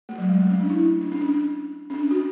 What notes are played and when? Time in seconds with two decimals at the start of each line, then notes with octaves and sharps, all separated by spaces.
0.09 A3
0.18 F#3
0.29 G#3
0.40 A3
0.50 C#4
0.60 D4
0.70 E4
1.01 D4
1.12 C#4
1.21 D4
1.90 C#4
1.94 D4
2.11 F#4